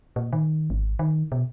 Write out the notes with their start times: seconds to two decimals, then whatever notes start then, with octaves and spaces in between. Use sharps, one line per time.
0.16 A#2
0.33 D#3
0.70 G#1
0.99 D#3
1.32 B2